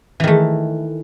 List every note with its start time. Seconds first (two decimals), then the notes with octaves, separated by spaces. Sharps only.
0.20 E3
0.24 D#3
0.27 A3